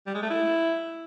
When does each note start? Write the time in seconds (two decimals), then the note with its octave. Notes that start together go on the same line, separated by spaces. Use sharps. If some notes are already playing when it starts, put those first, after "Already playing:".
0.06 G3
0.14 G#3
0.22 A3
0.30 E4